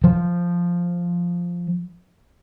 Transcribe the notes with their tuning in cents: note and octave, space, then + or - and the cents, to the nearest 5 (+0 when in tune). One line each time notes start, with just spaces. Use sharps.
F3 +0